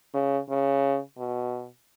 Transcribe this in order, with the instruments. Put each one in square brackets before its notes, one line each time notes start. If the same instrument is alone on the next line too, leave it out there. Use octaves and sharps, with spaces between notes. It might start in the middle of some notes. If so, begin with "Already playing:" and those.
[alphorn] C#3
C#3
B2